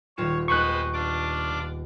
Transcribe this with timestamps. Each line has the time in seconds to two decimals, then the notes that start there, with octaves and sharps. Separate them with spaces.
0.17 D#1 F4 C#5 E7
0.48 D#2 G#3 B3 B4 C5 C#6 F#6
0.93 D4 F4 D6